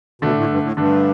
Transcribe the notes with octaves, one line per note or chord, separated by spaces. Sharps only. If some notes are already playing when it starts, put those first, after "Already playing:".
B2 D3 A3 D4
A2
G2
A2
G2 D3 A3 D4